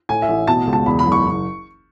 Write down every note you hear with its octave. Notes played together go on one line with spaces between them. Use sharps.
A2 G#5
E5
A1
B2 A5
C#2
A5
E2 B5
B5
F#1
C#6